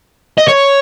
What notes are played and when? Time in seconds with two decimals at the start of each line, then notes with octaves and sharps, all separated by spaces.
0.38 D#5
0.48 C#5